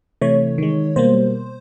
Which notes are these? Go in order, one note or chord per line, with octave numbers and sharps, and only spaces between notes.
C3 E3 A3 C#5
D#3 G#3
B2 G3 A#3 C5